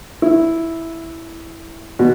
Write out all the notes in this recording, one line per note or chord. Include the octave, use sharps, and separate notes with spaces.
E4
B2